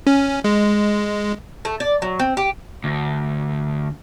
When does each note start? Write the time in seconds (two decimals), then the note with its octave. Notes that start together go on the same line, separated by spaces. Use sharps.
0.07 C#4
0.44 G#3
1.65 A3
1.80 D5
2.02 F#3
2.19 C4
2.37 G4
2.84 D2